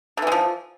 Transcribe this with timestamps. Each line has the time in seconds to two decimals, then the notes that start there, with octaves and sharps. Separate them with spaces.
0.17 D3
0.22 E3
0.27 G#3
0.32 F3